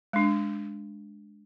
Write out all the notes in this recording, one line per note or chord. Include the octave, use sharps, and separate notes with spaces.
G#3 D4